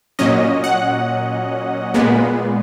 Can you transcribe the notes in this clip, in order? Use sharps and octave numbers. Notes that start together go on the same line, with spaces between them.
A#2 F#3 C#4 D#5
F#5
A#2 G#3 B3